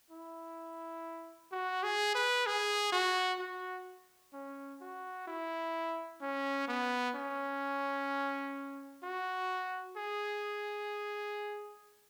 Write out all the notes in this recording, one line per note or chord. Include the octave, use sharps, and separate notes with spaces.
E4
F#4
G#4
B4
G#4
F#4
F#4
C#4
F#4
E4
C#4
B3
C#4
F#4
G#4